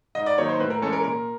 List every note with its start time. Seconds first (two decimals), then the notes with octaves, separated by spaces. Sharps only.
0.15 G#2 D#5
0.26 D5
0.38 D#3 F#3 A#3 D#4 C#5
0.49 C5
0.59 A2 B4
0.70 A#4
0.82 E3 G#3 C#4 A4
0.92 A#4
1.04 A#2 A#4